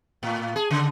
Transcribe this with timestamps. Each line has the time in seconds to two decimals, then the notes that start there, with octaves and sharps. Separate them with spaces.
0.23 A2
0.56 G#4
0.71 C#3